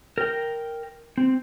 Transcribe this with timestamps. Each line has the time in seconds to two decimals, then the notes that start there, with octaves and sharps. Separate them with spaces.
0.18 A#4 G5
1.18 C4